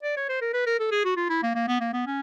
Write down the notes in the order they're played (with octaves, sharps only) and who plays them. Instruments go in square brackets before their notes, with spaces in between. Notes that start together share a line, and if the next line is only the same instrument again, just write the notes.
[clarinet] D5
C#5
C5
A#4
B4
A#4
A4
G#4
F#4
F4
E4
A#3
A#3
B3
A#3
B3
C#4